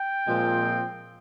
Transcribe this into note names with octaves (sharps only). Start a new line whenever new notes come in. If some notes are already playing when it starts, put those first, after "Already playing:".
Already playing: G5
A#2 F3 G#3 C4